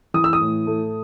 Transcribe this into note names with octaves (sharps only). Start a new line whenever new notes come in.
E3 D#6
E6
D#6
A2
A3